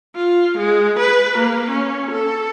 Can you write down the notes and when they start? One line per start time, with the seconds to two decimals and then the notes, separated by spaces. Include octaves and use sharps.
0.16 F4
0.58 G#3
0.99 B4
1.38 A#3
1.70 C#4
2.11 A4